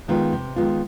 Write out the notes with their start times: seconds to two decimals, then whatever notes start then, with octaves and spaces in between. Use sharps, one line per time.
0.08 D#3 G#3 B3 F4
0.33 C3
0.56 D#3 G#3 B3 F4